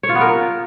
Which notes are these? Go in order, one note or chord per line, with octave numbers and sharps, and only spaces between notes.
C#5
F4
B3
A#4